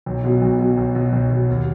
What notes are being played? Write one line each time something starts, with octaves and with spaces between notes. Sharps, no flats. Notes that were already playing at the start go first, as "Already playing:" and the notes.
B1
B2 F#3
B1
B2 F#3
B1
B2 F#3
B1
B2 F#3
D#2